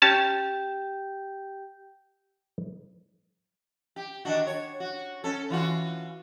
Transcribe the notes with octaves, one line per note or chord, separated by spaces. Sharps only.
C#4 G4 G5 A5 A#5 G6
G4
D#3 D4 F#4
C#5
F#4
C#4 A4
E3 F4 F#4